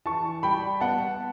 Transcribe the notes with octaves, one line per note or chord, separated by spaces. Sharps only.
E3 A5 C#6
G3 G5 B5
B3 F#5 A5